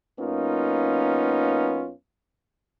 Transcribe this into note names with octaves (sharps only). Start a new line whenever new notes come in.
F#2 A#3 B3 C#4 D#4 F4